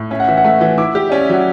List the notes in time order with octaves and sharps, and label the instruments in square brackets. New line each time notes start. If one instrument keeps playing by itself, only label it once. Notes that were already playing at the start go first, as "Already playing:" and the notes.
Already playing: [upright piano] A2
[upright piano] C#4 [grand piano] E5
[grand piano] F#5
[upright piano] E3 [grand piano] E5
[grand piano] F#5
[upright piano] A3 [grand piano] E5
[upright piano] E3
[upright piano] E4 [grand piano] D6
[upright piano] G4
[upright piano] C#4 [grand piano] D5
[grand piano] E5
[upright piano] F#3 [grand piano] F#5